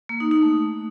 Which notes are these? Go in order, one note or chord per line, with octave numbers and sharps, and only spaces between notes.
A#3
D#4
D#4
A3